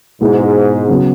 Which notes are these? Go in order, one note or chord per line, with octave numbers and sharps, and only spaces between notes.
G#2 B2 G#3 B3 E4
C#3 F#3 B3